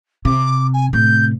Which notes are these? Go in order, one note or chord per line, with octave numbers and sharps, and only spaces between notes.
C3 D6
G#5
A2 C3 G6